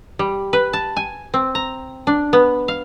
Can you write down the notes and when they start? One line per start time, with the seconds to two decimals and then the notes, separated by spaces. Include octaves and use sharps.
0.19 G3
0.53 B4
0.73 A5
0.97 G#5
1.34 C4
1.55 A#5
2.07 D4
2.33 B3
2.68 F5